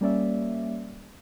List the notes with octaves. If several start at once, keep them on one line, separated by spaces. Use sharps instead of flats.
G3 A#3 C#4 D5 E5